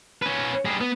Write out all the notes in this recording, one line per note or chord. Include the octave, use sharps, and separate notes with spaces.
C#4 B4
G3 G#4
B3